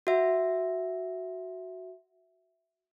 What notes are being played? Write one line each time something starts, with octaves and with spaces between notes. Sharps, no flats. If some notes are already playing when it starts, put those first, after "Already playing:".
F#4 E5